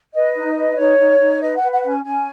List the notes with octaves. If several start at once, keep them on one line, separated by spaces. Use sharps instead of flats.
B4 D#5
D#4
B4
D#4 C#5
D#4
D#4
B4 D#5
F#5
B4
F#5
C#4 F#5
G#5
C#4 G#5